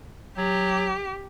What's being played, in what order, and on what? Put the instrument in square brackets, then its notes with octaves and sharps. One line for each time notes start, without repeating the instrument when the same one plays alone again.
[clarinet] F#3 [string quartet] G4